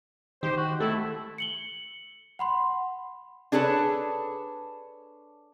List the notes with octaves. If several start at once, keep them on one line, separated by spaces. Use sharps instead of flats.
D#3 G4 C5
F#4
A3 E4 A4
C#7 F#7 G7
F#5 B5 C6
D4 G#4 A4 B4 C#5